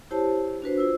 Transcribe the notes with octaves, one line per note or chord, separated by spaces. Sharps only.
E4 G4 C5 C#5 A5
D4 F#4 B4 C5
F4 C5 E6